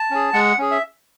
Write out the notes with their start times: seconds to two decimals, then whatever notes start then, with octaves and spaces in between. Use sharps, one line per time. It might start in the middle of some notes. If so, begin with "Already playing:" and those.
Already playing: A5
0.11 C#4 G#4
0.33 G#3 F#5
0.58 C#4 G#4
0.71 E5